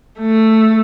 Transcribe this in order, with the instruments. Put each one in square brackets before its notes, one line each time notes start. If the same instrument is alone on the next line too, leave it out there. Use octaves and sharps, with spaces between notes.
[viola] A3